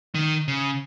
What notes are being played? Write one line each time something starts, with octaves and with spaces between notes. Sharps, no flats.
D#3
C#3